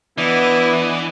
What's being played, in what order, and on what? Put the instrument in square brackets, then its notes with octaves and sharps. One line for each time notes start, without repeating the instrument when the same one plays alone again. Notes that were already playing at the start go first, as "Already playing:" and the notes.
[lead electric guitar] E3 [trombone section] B3 [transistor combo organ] D4 D#5 [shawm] E4